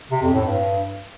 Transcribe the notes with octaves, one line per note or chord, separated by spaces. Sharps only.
C3
F2
A2
G2